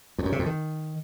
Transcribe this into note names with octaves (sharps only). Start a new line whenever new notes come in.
F2
F#2
C3
F2
D#3